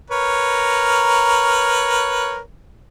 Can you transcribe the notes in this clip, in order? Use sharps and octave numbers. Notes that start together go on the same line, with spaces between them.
A#4 B4 C#5